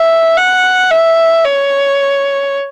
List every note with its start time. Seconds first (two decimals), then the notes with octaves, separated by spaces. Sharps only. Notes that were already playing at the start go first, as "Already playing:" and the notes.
Already playing: E5
0.37 F#5
0.91 E5
1.44 C#5